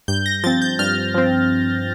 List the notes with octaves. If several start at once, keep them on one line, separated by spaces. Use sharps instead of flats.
G2 G6
A#6
F3 C4 A6
G6
G2 F6
F3 C4